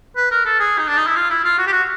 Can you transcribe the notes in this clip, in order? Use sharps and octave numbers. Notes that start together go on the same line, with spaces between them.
B4
A#4
A4
G#4
D#4
D4
D#4
E4
F4
E4
F4
F#4
G4
F#4